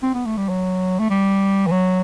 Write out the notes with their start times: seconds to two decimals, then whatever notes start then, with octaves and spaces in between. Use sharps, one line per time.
0.03 C4
0.14 B3
0.26 A3
0.37 G3
0.49 F#3
0.99 A3
1.10 G3
1.67 E3
1.71 F#3